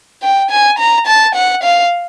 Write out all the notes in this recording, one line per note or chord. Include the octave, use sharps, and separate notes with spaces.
G5
G#5
A#5
A5
F#5
F5